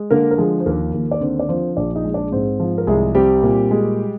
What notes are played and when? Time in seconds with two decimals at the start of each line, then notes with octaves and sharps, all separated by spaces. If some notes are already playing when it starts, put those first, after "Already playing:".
Already playing: G#3
0.10 D3 A#3 A#4
0.31 A#4
0.38 F3 G#3 G#4
0.60 C5
0.66 D#2 A#3 A#4
0.94 D#2
1.11 D5
1.21 D3 C4 C5
1.39 D5
1.49 F3 C4 C5
1.76 A#1 D4 D5
1.96 D#4 D#5
2.04 G#3
2.14 D4 D5
2.32 G#2 C4 C5
2.60 F3
2.78 A#4
2.87 C2 G#3 G#4
3.15 G3 C4 G4
3.43 A#2
3.71 G#3